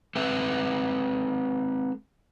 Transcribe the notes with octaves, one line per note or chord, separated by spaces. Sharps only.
G#3 C4 A4 B4 E5